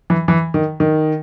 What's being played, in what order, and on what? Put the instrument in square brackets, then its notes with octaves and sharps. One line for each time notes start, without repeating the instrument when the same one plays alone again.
[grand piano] E3
E3
D#3
D#3